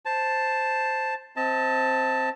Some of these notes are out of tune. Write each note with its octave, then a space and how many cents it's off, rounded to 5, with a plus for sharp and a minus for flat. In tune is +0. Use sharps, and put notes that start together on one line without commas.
C5 +0 A5 +0
C4 +0 D#5 +35 A5 +5